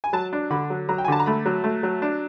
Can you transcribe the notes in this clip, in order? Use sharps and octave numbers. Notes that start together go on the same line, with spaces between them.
G#5
F#3 A5
D4
D3 B5
F#3
F#3 A#5
G5
G#5
D3 A5
A#5
A3 B5
F#3
A3
F#3
D4